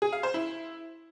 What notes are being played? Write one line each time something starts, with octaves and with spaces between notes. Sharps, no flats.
G#4
F5
C5
E4